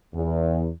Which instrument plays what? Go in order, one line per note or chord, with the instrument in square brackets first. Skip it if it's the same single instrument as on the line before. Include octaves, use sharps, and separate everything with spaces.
[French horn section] E2